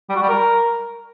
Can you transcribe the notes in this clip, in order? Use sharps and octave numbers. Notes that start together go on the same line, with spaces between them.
G3
F#4
G3
A#4